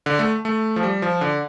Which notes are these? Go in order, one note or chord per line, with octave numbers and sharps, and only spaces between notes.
D3
A3
A3
F3
G3
F3
D3